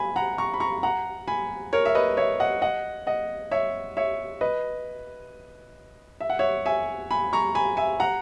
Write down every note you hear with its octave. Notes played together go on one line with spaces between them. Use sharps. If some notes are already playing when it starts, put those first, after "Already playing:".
Already playing: G#5 B5
F#5 A#5
A#5 C#6
B5
A#5 C#6
F#5 A#5
G#5 B5
A#4 C#5
E5
B4 D#5
C#5 E5
D#5 F#5
D#5 F#5
D#5 F#5
C#5 E5
C#5 E5
B4 D#5
E5
F#5
C#5 E5
E5 G#5
G#5 B5
A#5 C#6
G#5 B5
E5 G#5
F#5 A#5